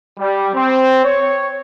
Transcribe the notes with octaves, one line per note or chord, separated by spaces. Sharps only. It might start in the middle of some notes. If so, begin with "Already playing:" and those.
G3
C4
C#5